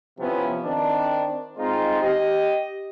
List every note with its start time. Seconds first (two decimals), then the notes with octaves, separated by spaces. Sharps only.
0.19 C3 F3 B3 C#4 E4
0.63 D#3 C4 D4
1.58 G#3 C4 D#4 F4
2.01 G4 D#5